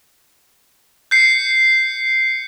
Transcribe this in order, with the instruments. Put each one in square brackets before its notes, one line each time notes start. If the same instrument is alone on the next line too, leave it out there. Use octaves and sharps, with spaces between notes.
[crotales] G6 C7 C#7